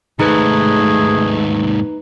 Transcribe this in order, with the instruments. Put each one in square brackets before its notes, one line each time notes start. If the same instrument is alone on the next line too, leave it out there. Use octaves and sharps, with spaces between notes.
[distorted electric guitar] D#2 G#2 [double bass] A3 [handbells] D#4 B4 [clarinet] G#4